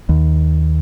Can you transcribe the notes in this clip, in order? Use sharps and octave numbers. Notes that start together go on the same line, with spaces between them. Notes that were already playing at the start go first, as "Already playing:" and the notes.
D#2